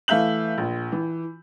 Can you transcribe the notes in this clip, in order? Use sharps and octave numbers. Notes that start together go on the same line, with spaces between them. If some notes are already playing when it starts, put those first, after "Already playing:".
E3 A3 E5 F5 G6 F#7
A#1
E3